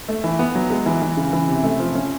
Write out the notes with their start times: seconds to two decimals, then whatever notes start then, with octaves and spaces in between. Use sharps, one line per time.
0.09 A3
0.24 E3
0.39 B3
0.55 F#3
0.70 G#3
0.86 E3
1.02 E3
1.17 C#3
1.33 E3
1.48 C3
1.64 A3
1.80 F3
1.95 C#4